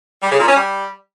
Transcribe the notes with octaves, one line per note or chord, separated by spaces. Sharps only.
G3
C#3
A#2
C#4
G3